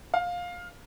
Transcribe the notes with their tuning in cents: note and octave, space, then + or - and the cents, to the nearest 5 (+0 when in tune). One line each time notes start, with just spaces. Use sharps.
F5 +15